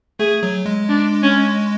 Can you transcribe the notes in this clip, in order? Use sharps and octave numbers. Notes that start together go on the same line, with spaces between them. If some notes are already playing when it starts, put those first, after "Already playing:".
A3 G#4
F#3
G#3
D4
C#4